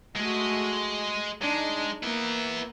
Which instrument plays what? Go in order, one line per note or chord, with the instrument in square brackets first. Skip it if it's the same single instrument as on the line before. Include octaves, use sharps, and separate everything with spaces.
[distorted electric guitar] G#3 G#4 [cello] A3 F#4
[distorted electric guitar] G#3 [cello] D4 D#4
[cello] A#3 [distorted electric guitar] B3 E4